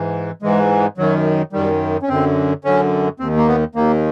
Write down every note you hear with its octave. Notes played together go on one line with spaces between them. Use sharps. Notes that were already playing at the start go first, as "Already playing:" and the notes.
Already playing: G#2 E3
G#2 E3 G#3
F#2 D#3 F#3
F#2 D#3 G3
C#4
F#2 D3 C4
F#2 D3 C#4
D#2 D#3 C4
A#3
B3
D#2 D#3 A#3